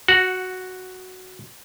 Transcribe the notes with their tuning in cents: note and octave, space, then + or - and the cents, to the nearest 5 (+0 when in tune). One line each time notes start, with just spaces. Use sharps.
F#4 +0 F#5 -20